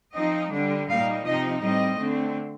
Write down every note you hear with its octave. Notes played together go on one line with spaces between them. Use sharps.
F3 C4 D#4 D#5
D3 G3 D4
A#2 G3 A#3 D#4 F5
C3 F3 C4 D#4 D#5
A2 G3 C4 D#5
D3 A3 C4